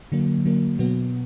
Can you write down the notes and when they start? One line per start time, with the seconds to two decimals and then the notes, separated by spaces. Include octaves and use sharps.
0.12 D3 F#3 A#3
0.45 D3 F#3 A#3
0.79 B2 F#3 B3